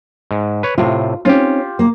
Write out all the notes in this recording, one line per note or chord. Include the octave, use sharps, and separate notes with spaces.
G#2
B4 C#5
A2 C3 F4
C4 C#4 D#4 F4 G4
A#3